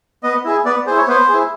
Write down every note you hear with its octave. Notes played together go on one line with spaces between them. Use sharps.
B3 D#5
E4 G#4
B3 D5
E4 G#4 C5
C#5
B3 C5
E4 G#4